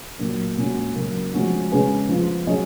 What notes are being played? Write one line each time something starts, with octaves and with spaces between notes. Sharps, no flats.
A#2 F#3 A#3
A#2 G#3 C#4 F#4
C#3 F#3 A#3
F3 G#3 C#4 F#4
C#3 G#3 C#4 G#4 B4
F3 B3 F4
F#3 C#4 G#4 D#5